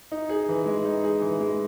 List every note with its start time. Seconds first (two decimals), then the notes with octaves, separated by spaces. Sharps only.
0.12 D#4
0.29 G#4
0.48 E3
0.66 G#3
0.84 D#4
1.04 G#4
1.21 E3
1.41 G#3